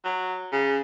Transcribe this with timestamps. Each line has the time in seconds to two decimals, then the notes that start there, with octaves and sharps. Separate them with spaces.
0.04 F#3
0.52 C#3